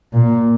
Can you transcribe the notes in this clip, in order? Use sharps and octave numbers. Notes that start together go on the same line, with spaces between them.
A#2